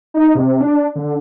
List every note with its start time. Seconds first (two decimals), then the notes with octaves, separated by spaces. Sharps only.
0.14 D#4
0.35 C3
0.61 D4
0.96 D3